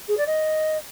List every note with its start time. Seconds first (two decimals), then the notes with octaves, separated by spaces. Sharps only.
0.08 G#4
0.17 D5
0.26 D#5